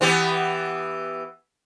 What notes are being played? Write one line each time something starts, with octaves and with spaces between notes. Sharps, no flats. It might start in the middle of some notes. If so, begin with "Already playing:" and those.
E3 B3 G4